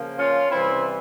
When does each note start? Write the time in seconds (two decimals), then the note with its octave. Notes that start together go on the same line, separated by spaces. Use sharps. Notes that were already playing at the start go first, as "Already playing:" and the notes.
Already playing: C#3 F3 A#3
0.19 C#4 F4
0.51 C3 E3 G3 C4 E4